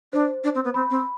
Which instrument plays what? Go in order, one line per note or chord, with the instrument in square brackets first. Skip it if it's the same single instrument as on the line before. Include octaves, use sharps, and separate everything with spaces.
[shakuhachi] D4 [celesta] C5
[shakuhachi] D4
C4
B3
[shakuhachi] C4 [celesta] B5
[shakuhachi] C4